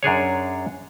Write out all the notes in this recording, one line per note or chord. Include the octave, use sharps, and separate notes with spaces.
F#2 D4 G#4 C#5